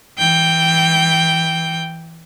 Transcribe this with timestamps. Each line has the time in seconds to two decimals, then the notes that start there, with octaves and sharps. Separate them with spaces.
0.19 E3 G5